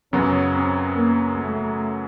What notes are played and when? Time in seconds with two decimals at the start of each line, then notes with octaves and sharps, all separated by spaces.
0.13 F#2 C#3 F#3 B3 C#4
0.54 C4
0.95 A#3
1.35 A3